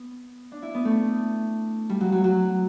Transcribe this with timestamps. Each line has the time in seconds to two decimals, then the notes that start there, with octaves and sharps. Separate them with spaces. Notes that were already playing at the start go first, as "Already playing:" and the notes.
Already playing: B3
0.52 D4
0.62 E4
0.75 B3
0.85 A3
1.89 G3
2.01 F#3
2.12 F#3
2.24 F#3